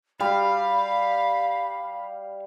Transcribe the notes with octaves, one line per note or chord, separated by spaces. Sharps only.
G3 F5 B5